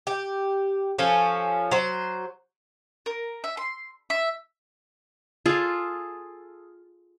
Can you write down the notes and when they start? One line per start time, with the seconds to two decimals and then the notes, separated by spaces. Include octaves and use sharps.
0.07 G4
0.98 F3 C#4 A4
1.71 F#3 C5
3.06 A#4
3.44 E5
3.57 C6
4.10 E5
5.46 F4 G#4 A4